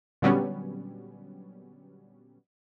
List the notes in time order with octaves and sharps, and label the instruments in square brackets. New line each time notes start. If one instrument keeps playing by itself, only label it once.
[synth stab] A#2 D3 F#3 G3 B3 C#4